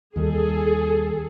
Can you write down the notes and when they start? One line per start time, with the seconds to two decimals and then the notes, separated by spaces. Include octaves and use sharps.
0.16 D#2 D#3 G3 G#4 A4